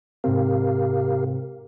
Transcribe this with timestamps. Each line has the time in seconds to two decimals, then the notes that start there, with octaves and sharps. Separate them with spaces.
0.24 G#2 C3 C4 G4 A#4 F5